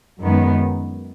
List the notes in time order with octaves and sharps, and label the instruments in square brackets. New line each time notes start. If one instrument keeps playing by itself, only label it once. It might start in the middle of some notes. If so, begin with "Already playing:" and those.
[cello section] F#2 D#3 G#3 B3